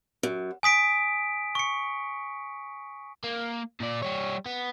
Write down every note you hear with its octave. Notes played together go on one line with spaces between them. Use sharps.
F#2
G#5 D#6 B6 D7
C#6 C#7
A#3
A#2 D5
G3 C#5
B3